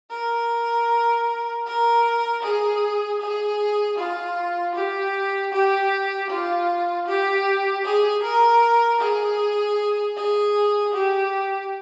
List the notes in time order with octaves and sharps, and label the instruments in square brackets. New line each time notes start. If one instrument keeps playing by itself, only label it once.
[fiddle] A#4
A#4
G#4
G#4
F4
G4
G4
F4
G4
G#4
A#4
G#4
G#4
G4